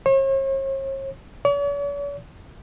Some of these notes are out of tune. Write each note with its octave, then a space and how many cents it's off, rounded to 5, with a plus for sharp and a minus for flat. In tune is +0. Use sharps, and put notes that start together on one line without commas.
C#5 -45
C#5 +45